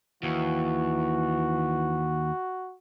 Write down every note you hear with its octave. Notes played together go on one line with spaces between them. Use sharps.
D#2 E3 F#4